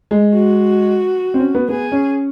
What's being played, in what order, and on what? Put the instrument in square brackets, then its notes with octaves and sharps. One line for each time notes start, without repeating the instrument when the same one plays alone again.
[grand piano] G#3
[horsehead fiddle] F#4
[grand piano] C4
C#4
B3
[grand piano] B3 [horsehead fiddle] G#4
[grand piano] C#4